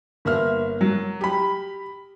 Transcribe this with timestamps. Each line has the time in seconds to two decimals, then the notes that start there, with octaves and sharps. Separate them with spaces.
0.25 G1 A#3 E5 F6
0.81 F#3
1.21 G4 B5